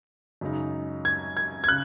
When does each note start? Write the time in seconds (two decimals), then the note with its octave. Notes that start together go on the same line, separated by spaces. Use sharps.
0.41 F#2 C#3 G#3 D#4
1.05 G#6
1.37 G#6
1.64 G#6
1.68 C#3 F#6